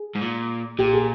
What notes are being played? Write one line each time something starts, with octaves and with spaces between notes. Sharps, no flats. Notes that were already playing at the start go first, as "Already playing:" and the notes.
Already playing: G#4
G#2
A#2
A#2 G4
G#4